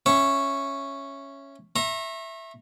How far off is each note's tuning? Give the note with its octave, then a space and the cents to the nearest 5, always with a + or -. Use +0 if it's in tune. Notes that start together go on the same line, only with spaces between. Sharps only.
C#4 -5 E5 +10 C#6 -5
E5 +0 A#5 +0 C#6 -40